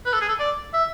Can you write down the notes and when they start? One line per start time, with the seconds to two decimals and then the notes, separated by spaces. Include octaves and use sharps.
0.06 B4
0.13 A4
0.21 G#4
0.29 A4
0.40 D5
0.73 E5